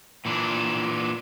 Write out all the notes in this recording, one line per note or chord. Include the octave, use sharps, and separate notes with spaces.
A#2 E3 D4